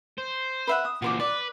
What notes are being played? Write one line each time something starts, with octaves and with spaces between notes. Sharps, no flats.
C5
B4 E5 F#5
D#6
A#2 E3 F#4 C5 D6
B4 D5